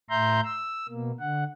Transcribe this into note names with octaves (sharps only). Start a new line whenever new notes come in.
A2 E5 A#5 C6 G6
E6
B2 A#3
D3 F#5